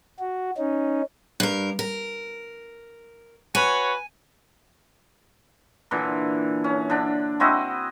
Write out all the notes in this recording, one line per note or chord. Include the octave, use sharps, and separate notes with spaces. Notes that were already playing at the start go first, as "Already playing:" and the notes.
F#4
C#4 D#4
G2 A#4
A#4
F#4 B4 C#5 G#5
A#2 D3 E3
C#4
D3 D4
C4 E4 F#4 D#5